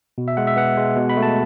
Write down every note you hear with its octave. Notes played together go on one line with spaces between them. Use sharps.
B2
E5
G#3 F#5
E5
B3 F#5
G#3
B2
B5
A3
A5